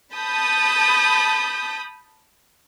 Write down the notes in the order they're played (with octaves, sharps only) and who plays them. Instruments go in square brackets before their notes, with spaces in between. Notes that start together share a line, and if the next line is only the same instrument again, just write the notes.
[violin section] A5 B5 D#6 G6